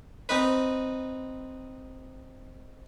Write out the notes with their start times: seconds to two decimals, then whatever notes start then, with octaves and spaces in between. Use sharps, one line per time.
0.29 C4 D#4 B4